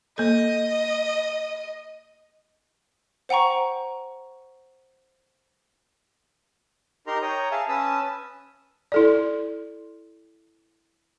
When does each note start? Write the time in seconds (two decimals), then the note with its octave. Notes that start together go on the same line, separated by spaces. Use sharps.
0.18 A#3 A4 D#5
3.29 C5 F#5 G5 A#5 C#6
7.07 D#4 G4 A#4 A#5 C6
7.22 C#5 G5 A#5 D#6
7.51 G#4 E5 F5 G#5 A5
7.68 C#4 B4 G#5 A5 D#6 E6
8.92 E4 A4 D5